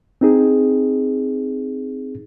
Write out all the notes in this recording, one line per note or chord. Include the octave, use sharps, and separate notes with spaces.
C4 D#4 G#4